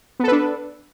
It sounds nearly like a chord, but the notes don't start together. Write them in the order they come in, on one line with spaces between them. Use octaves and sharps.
B3 A4 B4 D4